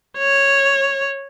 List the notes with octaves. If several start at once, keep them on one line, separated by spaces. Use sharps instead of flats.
C#5